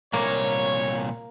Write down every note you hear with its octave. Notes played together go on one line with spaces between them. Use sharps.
C2 A#2 A#3 C#5